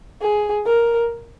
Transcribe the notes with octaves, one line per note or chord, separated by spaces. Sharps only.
G#4
A#4